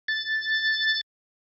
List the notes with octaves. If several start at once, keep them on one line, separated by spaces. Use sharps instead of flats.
A6